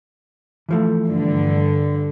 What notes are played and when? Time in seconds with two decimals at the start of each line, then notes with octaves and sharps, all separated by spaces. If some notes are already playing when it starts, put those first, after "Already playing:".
0.69 E3 F3 A3
1.07 G2 D3